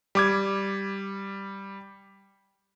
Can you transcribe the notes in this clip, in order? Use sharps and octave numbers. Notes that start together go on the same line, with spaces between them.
G3 D6 G#6